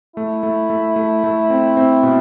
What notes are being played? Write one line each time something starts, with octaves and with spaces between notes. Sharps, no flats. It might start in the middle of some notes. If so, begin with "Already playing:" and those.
A3 E4
A3
A3
A3
A3
C4
C4
B2